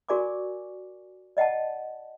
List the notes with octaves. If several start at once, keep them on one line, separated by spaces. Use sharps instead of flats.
F#4 A#4 D5 G#5 C#6 D6
D5 D#5 F#5 G5 A5